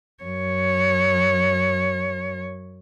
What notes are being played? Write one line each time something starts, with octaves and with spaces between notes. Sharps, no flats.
F#2 C#5